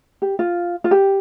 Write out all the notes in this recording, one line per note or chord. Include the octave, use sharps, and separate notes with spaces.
G4
F4
F4
G4